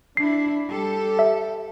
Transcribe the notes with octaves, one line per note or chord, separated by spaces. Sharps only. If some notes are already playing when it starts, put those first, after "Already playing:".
D4 E4 C7
G3 G4 A4
E5